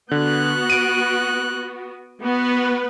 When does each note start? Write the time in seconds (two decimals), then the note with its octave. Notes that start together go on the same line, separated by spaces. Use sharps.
0.11 D3 B3 F#4 F#6
0.70 D7 D#7
2.23 B3 F#4 B4